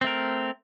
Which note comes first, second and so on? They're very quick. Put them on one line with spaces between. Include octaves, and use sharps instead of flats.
C4 A3 A#4